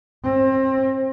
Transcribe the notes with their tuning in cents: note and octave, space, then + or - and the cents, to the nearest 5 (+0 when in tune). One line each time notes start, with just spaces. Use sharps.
C4 +30